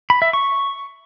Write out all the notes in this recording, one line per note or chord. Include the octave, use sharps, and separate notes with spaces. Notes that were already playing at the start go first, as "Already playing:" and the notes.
B5
E5
C#6